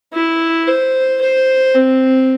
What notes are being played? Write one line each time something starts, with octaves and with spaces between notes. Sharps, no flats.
E4
C5
C5
C4